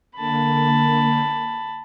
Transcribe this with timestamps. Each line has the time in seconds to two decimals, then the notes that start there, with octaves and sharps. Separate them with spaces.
0.17 D3 A#3 A5 B5